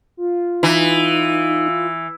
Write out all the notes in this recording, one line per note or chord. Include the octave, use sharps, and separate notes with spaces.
F4
E3 D#4